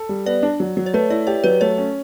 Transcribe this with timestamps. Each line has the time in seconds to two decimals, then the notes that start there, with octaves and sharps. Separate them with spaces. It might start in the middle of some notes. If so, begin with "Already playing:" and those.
Already playing: A4
0.09 G3
0.26 B3 D5
0.43 D4
0.60 F#3
0.77 F#3
0.86 C#5
0.94 A3 B4
1.10 E4 D5
1.27 G4 C#5
1.44 F#3 B4
1.61 A3 C#5
1.78 C#4